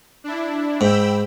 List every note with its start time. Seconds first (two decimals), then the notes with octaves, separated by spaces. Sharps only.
0.24 D4 E4
0.81 G#2 G5 B5 E6